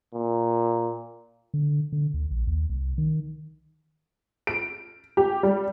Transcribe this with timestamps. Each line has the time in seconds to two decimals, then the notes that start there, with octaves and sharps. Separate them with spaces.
0.14 A#2
1.54 D3
1.92 D3
2.14 D2
2.31 A#1
2.47 D#2
2.69 C2
2.98 D#3
4.47 D7
5.17 G4
5.43 G3